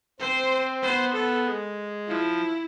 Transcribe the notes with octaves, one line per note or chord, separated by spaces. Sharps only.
C4 C5
B3 C5
B3 A4
G#3
F3 E4